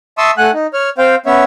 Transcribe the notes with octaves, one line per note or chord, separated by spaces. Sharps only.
E5 A5 C6 C#6 D#6 E6
A3 F#5 G#5 F#6
D#4
C#5 F6
C4 C5 F5 G5
B3 C#4 C#5 E5